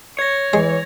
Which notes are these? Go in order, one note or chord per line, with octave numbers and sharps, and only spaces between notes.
C#5 G#6 A#6
E3 G#3